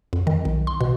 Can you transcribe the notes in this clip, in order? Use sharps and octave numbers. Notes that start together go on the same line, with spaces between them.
F2
D#3
B1
C6
B2